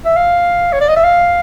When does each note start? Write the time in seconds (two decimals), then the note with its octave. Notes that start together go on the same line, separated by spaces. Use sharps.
0.05 E5
0.16 F5
0.73 C#5
0.81 D5
0.89 D#5
0.96 E5
1.04 F5